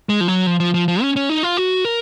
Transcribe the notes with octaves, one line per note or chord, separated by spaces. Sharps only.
G#3
F3
F#3
F3
F3
F3
F3
C#4
C#4
D#4
F4
F#4
A#4